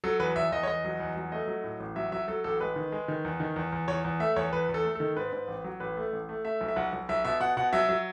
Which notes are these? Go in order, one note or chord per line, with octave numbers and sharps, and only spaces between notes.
F#3 A4
E2 B4
E2 E5
E2 D#5
C#5
E2 D#5
F#3
E2
F#3
A3 D#5
F#3
A2
A1
F#3 E5
F#3 E5
F#3 A4
A1 A4
G#3 B4
D#3
G#3
D#3
E2
D#3
E2
E2
E2 C#5
E2
A3 E5
E2 C#5
E2 B4
E2
A4
A3
D#3 A4
G#2 B4
G#2
A1
F#3
A1 B4
A3
A1
A3
A3 E5
B1
E5
B1 F#5
B1
B1 E5
B2 E5
B2 F#5
B2 F#5
F#3 E5
F#3